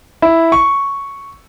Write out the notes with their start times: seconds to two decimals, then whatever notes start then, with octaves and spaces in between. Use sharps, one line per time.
0.22 E4
0.52 C#6